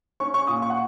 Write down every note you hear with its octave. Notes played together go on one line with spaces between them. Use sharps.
C#4 C#6
C#6
A#2 D#6
C#6
F#5